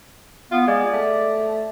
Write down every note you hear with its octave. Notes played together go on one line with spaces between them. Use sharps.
B3 F4
G#3 D5
A3